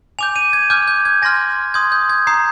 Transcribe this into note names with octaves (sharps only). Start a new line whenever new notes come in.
G#5 D6 G6 F7
D#7
G#6
G#5 D6 F6 G6
G6
G#6
G#5 C6 F6 A#6
C6 D#6 G6 G#6
G6
G#6
A#5 D#6 G6 C7